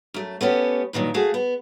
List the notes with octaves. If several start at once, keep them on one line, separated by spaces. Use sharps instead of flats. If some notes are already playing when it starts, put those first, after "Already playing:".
F#2 A3
A3 B3 C#4 G4
G2 A#2 D#3 F#3
A3 F#4 G#4 F5
B3